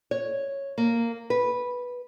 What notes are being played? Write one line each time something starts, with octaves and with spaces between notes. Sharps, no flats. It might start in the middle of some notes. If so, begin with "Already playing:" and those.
C#5
A#3
B4